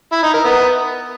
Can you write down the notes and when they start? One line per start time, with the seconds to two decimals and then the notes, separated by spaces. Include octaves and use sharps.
0.12 E4
0.23 D#4
0.34 A#4
0.45 B3